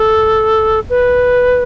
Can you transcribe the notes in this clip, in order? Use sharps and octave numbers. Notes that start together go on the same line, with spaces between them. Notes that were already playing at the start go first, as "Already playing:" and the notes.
Already playing: A4
B4